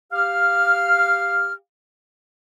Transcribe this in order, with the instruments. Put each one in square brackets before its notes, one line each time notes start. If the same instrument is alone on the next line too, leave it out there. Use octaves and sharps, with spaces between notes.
[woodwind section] G4 F5 F6